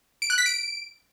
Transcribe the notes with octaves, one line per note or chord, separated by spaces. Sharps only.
D7
F#6
B6
D7